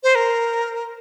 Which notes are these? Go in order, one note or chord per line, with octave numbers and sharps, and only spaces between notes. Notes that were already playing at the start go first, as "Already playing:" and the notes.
C5
A#4